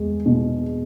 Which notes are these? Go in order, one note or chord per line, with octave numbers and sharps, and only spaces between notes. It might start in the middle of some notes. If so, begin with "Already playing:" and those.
Already playing: E2 G#3
B2